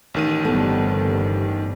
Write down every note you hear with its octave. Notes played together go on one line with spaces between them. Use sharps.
A1 D#3 D#7
G1 C3 G3 B3 A4